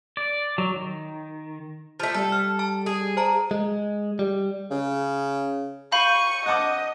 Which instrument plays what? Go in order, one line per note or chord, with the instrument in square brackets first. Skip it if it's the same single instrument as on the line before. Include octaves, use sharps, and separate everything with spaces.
[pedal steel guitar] D5
F#3
D#3
[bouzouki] F3 A3
[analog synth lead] G3 [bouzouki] A4
[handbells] F6
A5
[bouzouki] G#4
[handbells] C5 A5 A#5
[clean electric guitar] G#3
G3
[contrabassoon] C#3
[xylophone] F5 B5 [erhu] C#6 [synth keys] G6 D#7
[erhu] D#5 [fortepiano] F#5 A5 D6